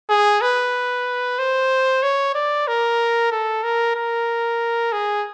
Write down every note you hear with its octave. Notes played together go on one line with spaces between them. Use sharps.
G#4
B4
C5
C#5
D5
A#4
A4
A#4
A#4
G#4